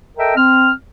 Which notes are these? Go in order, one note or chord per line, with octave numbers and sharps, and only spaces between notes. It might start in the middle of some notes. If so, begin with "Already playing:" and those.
A4 A#4 D#5 E5 G5
C4 F6